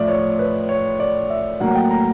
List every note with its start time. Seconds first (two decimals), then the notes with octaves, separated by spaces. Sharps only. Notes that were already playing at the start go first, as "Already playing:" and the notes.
Already playing: A2 F3 D5 E5
0.08 C#5
0.39 B4
0.69 C#5
1.00 D5
1.30 E5
1.60 A2 F#3 A#3 F#5
1.75 G5
1.91 A#5